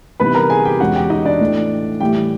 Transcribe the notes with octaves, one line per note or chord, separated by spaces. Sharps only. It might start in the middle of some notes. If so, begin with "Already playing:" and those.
C3 E3 G3 B3 D#4 B4 B5
A#4 A#5
G#4 G#5
G4 G5
E2 B2 G#3 C#4 F#4 F#5
G4 G5
D#4 D#5
D4 D5
A2 E3 A3
A2 E3 G3 G4 G5